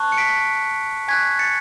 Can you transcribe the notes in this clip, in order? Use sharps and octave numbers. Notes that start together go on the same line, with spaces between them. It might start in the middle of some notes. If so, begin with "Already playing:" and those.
Already playing: A5 C#6 F#6
C#7
B6 D7
G#5 C#6 F#6 G#6 B6
A6 C#7